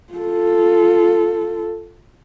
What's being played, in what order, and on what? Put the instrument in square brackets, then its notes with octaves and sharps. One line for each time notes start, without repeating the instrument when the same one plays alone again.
[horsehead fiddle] F4 A4